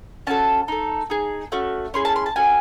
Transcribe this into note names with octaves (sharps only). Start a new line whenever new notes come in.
C#4 F#4 A4 A5
D#4 A4
D#4 G#4
A3 C#4 F#4
C#4 E4 G#4 C6
A5
C6
A5
C#4 F#4 A4 G#5